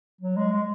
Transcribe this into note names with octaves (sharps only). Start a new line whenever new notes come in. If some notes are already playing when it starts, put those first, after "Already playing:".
F#3
G#3
G#3